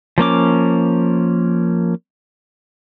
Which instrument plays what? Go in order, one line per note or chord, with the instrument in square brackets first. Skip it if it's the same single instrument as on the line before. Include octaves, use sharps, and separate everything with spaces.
[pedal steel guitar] F3 A#3 C#4 D6